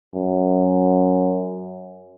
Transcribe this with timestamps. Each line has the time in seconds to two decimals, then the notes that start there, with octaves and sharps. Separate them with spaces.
0.14 F#2